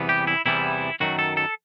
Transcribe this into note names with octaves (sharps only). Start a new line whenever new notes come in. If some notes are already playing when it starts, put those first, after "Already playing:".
Already playing: E2 C3 E3 G3 B3
G4
E4
E2 C3 E3 G3 B3 E4
F#2 D#3 F#3 A3 F#4
A4
A4